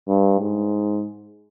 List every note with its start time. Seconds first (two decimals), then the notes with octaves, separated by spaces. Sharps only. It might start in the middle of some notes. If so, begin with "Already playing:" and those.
0.09 G2
0.40 G#2